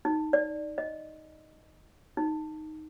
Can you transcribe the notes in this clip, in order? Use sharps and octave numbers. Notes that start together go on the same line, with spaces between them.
D#4
D5
D#5
D#4